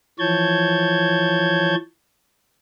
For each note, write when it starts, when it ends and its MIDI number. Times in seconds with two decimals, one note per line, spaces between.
0.19 1.75 52
0.19 1.75 53
0.19 1.75 73
0.19 1.75 81
0.19 1.75 91
0.19 1.75 92